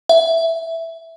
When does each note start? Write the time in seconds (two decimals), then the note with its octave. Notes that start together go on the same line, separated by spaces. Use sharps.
0.09 E5